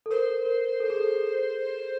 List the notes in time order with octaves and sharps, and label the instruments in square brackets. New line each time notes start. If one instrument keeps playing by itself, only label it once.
[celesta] A4
[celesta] A#4 [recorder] C5
[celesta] A#4
A4
G#4
A4